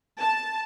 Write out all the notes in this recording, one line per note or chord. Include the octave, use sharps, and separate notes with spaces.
A5